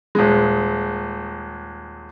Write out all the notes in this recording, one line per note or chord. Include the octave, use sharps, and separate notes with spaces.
D#1 G#3